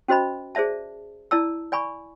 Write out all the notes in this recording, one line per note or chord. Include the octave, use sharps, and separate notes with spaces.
C#4 F#4 C5 D#5 B5
G#4 C5 D5 E5 A5
E4 D5 A5 E6
D5 G#5 B5 C#6